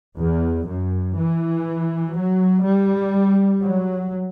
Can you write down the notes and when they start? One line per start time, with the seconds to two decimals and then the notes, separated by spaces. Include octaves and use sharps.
0.17 E2
0.66 F#2
1.15 E3
2.14 F#3
2.63 G3
3.61 F#3